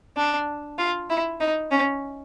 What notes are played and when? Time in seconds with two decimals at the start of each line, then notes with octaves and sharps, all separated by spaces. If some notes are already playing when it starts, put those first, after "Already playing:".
0.17 D4
0.78 F4
1.10 E4
1.40 D#4
1.71 C#4